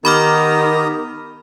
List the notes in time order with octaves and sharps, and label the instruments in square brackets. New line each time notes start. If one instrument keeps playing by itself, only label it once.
[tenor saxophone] D#3 [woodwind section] B3 G4 [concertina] A#5 D#6 [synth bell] B5 D6 F6